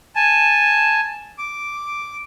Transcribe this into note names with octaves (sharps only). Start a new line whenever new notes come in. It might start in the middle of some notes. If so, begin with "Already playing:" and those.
G#5 A5
D6